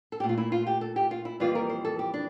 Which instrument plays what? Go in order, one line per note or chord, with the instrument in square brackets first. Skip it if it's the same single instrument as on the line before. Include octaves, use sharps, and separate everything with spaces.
[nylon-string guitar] A4
A#2 A3 G4
F4
E4
F4
G4
A4
G4
F4
E4
F2 E3 G3 A#3 F4
A#4
C5
A4
G4
D4